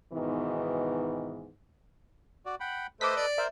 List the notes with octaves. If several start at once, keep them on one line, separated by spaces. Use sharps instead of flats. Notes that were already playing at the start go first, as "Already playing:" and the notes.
G#2 B2 D#3 E3 B3
F#4 D5
F#5 G5 B5
A3 A4 B4 C5 D#5 D6 B6
D5
A#4 C5 E5